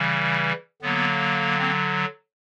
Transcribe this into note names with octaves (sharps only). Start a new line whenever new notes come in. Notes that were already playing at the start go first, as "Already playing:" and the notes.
Already playing: C#3 E3 G3
D3 F#3 A#3 B3
A#3 C4